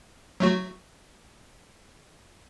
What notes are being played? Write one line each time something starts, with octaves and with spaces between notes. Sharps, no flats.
F#3 A3 F#4